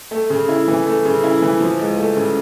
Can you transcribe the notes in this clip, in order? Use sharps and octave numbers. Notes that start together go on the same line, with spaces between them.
A3
C#3
E4
E3
A3
C#3
E4
E3
F3
C#2
A3
C#3